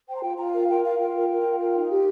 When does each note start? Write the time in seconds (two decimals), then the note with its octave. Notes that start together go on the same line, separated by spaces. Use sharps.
0.08 C5 G5
0.15 A#5
0.23 F4 G5
0.38 F4 A#5
0.53 A#4 F5
0.68 A#4 G5
0.83 F4 F5
0.99 F4 G5
1.14 A#4
1.29 A#4
1.44 F4
1.59 A#4
1.75 D#4
1.89 G4